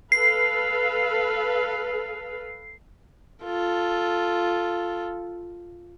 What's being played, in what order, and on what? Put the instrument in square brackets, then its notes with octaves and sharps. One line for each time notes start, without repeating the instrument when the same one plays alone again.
[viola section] A4 B4 F5 [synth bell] C7
[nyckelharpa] F4 A4